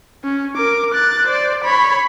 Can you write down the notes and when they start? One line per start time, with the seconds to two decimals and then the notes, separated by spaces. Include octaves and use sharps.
0.24 C#4
0.56 A#4 D6
0.94 F#6 A6
1.27 C5 D5
1.64 C#5 B5